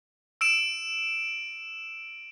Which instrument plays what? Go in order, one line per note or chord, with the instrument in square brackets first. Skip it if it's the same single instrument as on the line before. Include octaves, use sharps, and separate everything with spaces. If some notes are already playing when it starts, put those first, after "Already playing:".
[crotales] E6 D7 E7